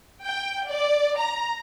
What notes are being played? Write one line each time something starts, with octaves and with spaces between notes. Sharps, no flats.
G5
D5
A#5